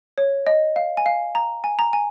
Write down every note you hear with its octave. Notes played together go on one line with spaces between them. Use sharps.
C#5
D#5
F5
G#5
F5
A#5
G#5
A#5
G#5